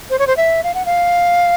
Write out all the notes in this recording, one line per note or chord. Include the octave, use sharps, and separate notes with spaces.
C5
C#5
C5
E5
F5
F#5
F5